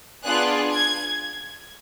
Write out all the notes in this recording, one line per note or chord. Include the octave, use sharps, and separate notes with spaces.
B3 D4 F4 G#4 F#6
G#6